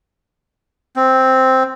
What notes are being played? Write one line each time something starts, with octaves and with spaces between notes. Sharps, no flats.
C4